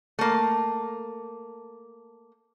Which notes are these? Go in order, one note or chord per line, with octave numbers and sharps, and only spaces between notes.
A3 A#3